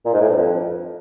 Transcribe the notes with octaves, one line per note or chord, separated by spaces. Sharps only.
A#2
G#2
A2
G2
F2